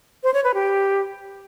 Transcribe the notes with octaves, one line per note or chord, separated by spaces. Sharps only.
C5
C#5
B4
G4